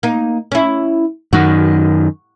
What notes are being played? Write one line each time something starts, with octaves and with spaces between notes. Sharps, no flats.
A#3 D#4
C#4 E4
F#2 D#3 F#4